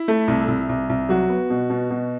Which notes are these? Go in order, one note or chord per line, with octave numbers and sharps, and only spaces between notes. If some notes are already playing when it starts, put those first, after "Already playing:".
Already playing: E4
A3
C2
C2
C2
C2
F#3 F#4
B3
B2
B2
B2